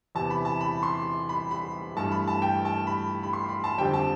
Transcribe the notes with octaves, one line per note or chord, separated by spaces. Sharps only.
E2 C3 E3 A5
B5
A5
B5
C6
B5
B5
G2 E3 A3 A5
B5
A5
G5
A5
B5
B5
C6
B5
A5
F2 D3 G3 C4 G5
A5